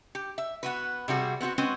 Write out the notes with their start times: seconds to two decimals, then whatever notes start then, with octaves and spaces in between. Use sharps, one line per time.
0.15 G4
0.38 E5
0.63 B3 F#4 B4
1.08 C3 G3 F#4 G#4
1.41 B3 C4 E4 F#4
1.58 G#3 C4 C#4 F#4 B4